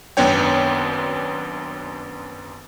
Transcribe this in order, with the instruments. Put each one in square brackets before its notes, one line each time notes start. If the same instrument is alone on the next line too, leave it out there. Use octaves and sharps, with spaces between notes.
[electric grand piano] G#1 F#2 B3 D4 C#5 G5